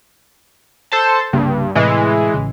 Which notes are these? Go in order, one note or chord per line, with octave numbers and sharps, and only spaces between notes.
A4 C5 A5
C2 G2 C#3 A#3
A2 C3 E3 G#3
A1 C#3